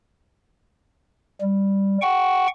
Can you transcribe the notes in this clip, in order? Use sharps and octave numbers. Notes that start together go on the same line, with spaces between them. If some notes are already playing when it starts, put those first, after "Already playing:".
G3
F#5 G5 C#6